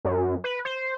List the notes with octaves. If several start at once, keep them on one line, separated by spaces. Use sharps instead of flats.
F#2
B4
C5